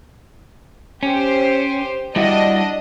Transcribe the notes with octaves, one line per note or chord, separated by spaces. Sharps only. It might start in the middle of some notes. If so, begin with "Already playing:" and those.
C#4 G4 C5
G3 D4 E4 F#4 D#5